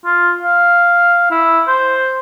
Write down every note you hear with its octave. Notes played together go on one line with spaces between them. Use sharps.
F4
F5
E4
C5